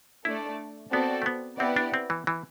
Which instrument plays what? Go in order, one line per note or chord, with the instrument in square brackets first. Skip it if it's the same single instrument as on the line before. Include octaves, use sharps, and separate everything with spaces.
[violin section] A3 D4 A4 D5 [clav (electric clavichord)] E4
[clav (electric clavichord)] B3 [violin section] C4 F#4 A4 D5
[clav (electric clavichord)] A3
B3
[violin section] B3 E4 G4 D5 F#5 [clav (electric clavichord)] C4
[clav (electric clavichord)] D4
C4
E3
E3